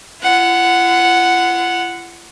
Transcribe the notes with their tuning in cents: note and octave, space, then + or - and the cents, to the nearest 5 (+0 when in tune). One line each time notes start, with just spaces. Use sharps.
F4 -45 F#5 +0